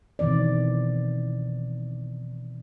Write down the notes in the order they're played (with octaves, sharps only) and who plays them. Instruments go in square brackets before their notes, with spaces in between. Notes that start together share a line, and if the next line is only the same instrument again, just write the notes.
[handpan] B2 D#3 E3 C4 D5